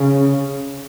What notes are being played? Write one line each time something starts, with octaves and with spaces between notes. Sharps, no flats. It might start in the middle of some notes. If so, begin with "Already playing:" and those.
Already playing: C#3